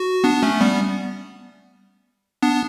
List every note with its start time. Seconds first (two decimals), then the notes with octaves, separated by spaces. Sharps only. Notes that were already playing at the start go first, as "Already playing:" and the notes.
Already playing: F#4
0.24 B3 D4
0.43 A3 C#4
0.61 G3 B3
2.42 B3 D4